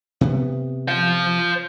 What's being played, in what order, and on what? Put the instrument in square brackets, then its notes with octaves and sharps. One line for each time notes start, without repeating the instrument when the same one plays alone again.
[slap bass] C3 B3
[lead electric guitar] C5 F5